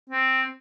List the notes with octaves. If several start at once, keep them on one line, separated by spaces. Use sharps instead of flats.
C4